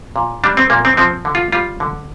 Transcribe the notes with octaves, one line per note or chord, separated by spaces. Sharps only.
A#2
G3 D4
C4
A#2 A#3
C4
F3 C4
D3
F4
G3 F4
D3